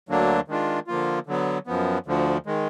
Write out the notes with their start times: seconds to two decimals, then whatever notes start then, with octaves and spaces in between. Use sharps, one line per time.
0.09 D2 D3 F#3 A#3 D4
0.48 D#3 G#3 D4 F4
0.87 D3 F3 A#3 F4
1.27 D3 F#3 B3
1.67 F#2 F3 B3
2.06 D2 D3 F3
2.46 D#3 G#3